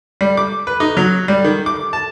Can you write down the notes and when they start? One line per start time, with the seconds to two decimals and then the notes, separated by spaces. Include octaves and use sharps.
0.21 G3
0.37 D6
0.67 B4
0.80 D#4
0.97 F#3
1.28 G3
1.44 D#3
1.66 D6
1.93 A5